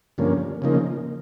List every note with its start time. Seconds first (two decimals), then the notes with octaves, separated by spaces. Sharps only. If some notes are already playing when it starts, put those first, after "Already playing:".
0.18 G2 D3 F3 A#3 C#4
0.62 C#3 F3 A#3 D#4